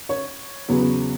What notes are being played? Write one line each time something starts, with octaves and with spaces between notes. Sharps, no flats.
C#5
E2 C#3 F#3 B3